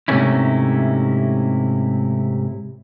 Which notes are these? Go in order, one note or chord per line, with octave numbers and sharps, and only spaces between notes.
G#2 C3 A3 A#3 C#4 E4